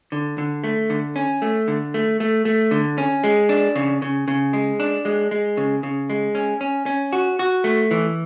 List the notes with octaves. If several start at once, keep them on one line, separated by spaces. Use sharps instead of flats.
D3
D3
A3
D3
C#4
A3
D3
A3
A3
A3
D3
C#4
G#3
D4
C#3
C#3
C#3
G#3
D4
G#3
G#3
C#3
C#3
G#3
C#4
C#4
C#4
F#4
F#4
A3
E3